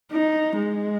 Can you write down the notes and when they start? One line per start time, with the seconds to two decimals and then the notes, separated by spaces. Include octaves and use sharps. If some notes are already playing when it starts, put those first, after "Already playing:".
0.11 D#4
0.57 G#3